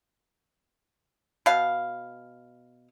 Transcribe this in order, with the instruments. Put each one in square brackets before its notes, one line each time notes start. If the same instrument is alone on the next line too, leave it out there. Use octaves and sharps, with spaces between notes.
[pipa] B2 F5